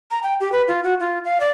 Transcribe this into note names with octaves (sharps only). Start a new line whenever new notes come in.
A#5
G5
G4
B4
F4
F#4
F4
F5
D5